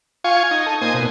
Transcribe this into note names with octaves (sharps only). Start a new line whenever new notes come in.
F4 F5 G#5 C#6
G#6
D#4
A4
A#2 C5 D#5 G#5
B2